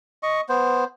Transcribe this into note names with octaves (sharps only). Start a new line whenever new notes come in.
D#5 C#6
B3 C5